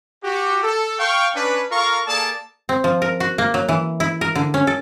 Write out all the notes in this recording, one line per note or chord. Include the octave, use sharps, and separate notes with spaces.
F#4 G4
A4
F5 G5 C#6
C#4 D4 B4
F4 A4 A#4 F5 A#5 C#6
A#3 G#4 A4 D5 A5
C4
F3
A#4
F#4
A#3
F#3
E3
E4
A#4
D3
C#4
A4